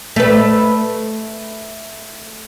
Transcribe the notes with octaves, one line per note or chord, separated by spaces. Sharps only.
A3 B4